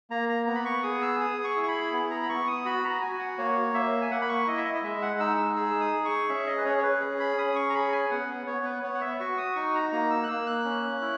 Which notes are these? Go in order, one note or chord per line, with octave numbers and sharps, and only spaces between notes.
A#3 A#5
A#5
B3 A#5
B5
C#6
G#4 D#6
E6
G#4 D#6
C#6
E4
C#6
B5
B3
A#5
B5
B3 C#6
D#6
F#4 B5
A#5
F#4 G#5
F#5
A#3 C#5
A#3 E5
G#5
A#3 F#5
B5
C#6
E4 D#5
E5
D#5
D#5
G#3 E5
F#5
D#4 E6
E6
G#4 E6
D#6
G#4
C#6
C#4 E5
D#5
B4
C#4 C#5
C#5
B4
G#4
B5
C#4 D#6
C#6
A#5
G#4 B5
G#5
B3 F#5
B3 C#5
B4
B3 C#5
F#5
E5
F#4 C#6
D#6
D#4 C#6
A#5
A#3 A#5
E6
F#6
A#3 E6
F#6
C#4
E4